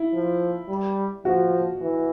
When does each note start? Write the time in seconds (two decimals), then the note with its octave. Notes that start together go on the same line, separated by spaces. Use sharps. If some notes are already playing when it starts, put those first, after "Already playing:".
Already playing: E4
0.13 F3
0.68 G3
1.25 F3 F#4
1.81 E3